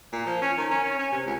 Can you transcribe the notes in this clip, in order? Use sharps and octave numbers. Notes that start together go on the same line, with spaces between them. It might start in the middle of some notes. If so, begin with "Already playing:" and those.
A#2
F3
C#4
D#3
C#4
C#4
C#4
C3
C#2